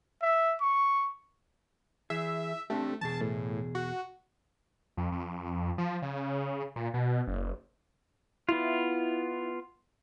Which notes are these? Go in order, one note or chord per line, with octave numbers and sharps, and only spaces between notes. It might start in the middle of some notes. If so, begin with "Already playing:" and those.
E5
C#6
E3 G#4 E5
A3 C4 D4 G4
E2 B2 G#4 A5
A2
F#4
F2
F2
F3
C#3
A#2
B2
F#1
B3 E4 F4